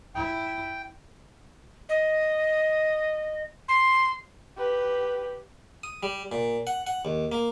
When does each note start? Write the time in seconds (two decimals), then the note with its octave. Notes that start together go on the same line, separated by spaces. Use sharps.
0.15 E4 G5
1.89 D#5
3.68 C6
4.58 G4 B4
5.83 D#6
6.03 G3
6.32 A#2
6.67 F#5
6.87 F#5
7.05 D#2
7.32 A#3